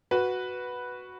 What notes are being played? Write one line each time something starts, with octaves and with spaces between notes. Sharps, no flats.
F#4 B4